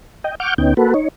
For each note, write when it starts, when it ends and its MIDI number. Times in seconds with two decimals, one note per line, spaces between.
0.24 0.35 75
0.24 0.35 79
0.40 0.54 78
0.40 0.54 85
0.40 0.54 86
0.40 0.54 89
0.40 0.54 91
0.58 0.74 38
0.58 0.74 59
0.58 0.74 61
0.58 0.74 63
0.58 0.74 79
0.77 0.94 58
0.77 0.94 66
0.77 0.94 69
0.77 0.94 71
0.94 1.08 63
0.94 1.08 73